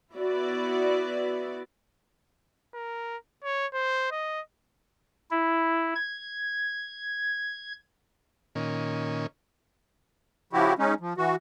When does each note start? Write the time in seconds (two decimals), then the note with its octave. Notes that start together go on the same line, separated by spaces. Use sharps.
0.15 B3 E4 F#4 B4 D5
2.74 A#4
3.44 C#5
3.74 C5
4.11 D#5
5.31 E4
5.95 G#6
8.55 A#2 D#3 C#4
10.53 C#3 F3 E4 F#4 G4
10.79 G#3 C#4 D#4
11.00 F3
11.17 E3 F#4